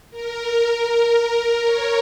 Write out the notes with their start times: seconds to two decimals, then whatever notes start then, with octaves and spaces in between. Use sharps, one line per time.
0.11 A#4
1.63 C#5